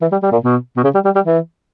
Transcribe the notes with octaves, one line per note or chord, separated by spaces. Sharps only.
E3
G3
G3
A#2
B2
B2
C#3
G3
G3
G3
E3